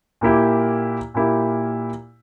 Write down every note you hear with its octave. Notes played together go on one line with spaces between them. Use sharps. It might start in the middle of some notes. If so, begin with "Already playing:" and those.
A#2 A#3 E4 G4
A#2 A#3 E4 G4